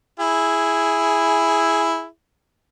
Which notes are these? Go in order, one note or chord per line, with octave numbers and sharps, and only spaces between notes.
E4 G#4